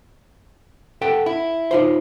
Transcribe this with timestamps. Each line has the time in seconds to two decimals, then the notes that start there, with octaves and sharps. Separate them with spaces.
1.01 A4 F#5 G5
1.26 E4
1.71 D#4 F4 C5